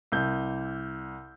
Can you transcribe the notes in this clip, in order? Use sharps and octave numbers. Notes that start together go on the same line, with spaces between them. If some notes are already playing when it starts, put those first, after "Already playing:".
C2 G6